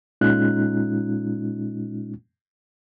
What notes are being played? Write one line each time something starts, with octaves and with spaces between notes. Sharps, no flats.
A#2 G#3 C#4 D#4 F4 F#6